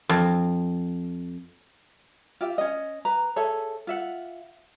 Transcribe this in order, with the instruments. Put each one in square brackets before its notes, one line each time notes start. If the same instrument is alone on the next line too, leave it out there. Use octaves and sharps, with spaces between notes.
[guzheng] F2
[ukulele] F4 G4 E5
C#4 D#5
B4 A#5
G#4 A4 C#5 E5
F4 E5 F#5